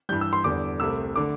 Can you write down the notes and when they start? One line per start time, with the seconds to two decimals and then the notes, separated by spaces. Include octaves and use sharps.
0.09 G2 E3 G3 G6
0.21 E6
0.33 C6
0.44 E2 D3 G3 D6
0.80 C2 C3 A3 E6
1.16 D3 A3 D6